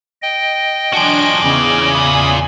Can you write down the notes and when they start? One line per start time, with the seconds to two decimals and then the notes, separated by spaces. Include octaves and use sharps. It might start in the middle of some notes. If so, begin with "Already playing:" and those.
0.22 D#5 G5
0.93 F3 D4 F#4 G#5 D7
1.42 E2 C#3 F4 D5 G#5
1.94 B5 D#6